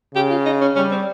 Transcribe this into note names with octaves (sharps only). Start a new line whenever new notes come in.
C#3 G4
F4
D#4
C#4
G3 C#4
C4